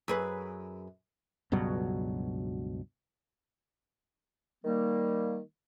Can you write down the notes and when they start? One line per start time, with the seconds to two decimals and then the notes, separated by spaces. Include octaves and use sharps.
0.08 F#2 G#4 B4
1.52 C#2 G2 B2 F#3
4.65 D#3 G3 A#3